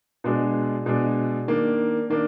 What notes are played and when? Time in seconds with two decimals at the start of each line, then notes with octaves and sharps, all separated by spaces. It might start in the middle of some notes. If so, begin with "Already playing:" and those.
0.24 B2 G#3 D4
0.86 B2 G#3 D4
1.48 D#3 A#3 D4
2.10 D#3 A#3 D4